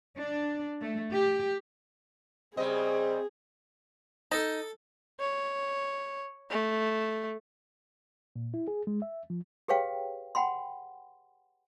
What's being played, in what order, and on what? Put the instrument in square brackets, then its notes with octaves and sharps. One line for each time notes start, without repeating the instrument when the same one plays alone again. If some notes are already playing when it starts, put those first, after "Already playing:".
[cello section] D4
A3
G4
[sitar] C#3 G3 D#5 [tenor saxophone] C4 [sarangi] G#4
[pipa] D#4 [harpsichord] A4 A5
[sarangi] C#5
A3
[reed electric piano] A#2
E4
G#4
G#3
E5
F3
[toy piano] G4 G#4 B4 C#5 F5 G5
F#5 G5 B5 C6